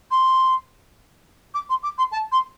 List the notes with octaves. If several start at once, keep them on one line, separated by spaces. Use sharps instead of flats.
C6
D6
C6
D6
C6
A5
C6